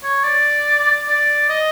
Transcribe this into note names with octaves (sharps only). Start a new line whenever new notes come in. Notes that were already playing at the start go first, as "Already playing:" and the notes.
C#5
D5
D5
D#5